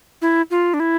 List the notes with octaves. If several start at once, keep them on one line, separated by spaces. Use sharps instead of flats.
E4
F4
D4
E4